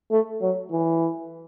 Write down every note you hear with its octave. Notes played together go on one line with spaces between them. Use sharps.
A3
F#3
E3